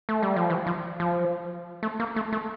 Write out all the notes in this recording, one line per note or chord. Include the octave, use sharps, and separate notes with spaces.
A3
G3
F3
E3
F3
F3
A3
A#3
A3
A3